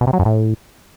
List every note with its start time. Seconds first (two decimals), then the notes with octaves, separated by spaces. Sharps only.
0.01 B2
0.07 C3
0.13 F#3
0.19 F#2
0.25 A2